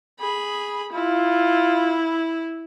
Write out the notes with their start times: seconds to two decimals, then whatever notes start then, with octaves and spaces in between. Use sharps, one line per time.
0.20 G#4 B5
0.92 E4 F4